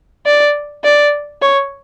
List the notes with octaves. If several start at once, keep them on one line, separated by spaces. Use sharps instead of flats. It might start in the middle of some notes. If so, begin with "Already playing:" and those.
D5
D5
C#5